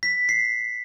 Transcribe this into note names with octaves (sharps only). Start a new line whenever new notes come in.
B6
C7